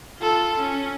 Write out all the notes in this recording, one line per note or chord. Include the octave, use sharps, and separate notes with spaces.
F4 A4
C#4